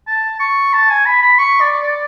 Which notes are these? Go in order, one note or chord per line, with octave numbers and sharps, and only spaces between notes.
A5
C#6
A5
G#5
B5
B5
C#6
D5
D5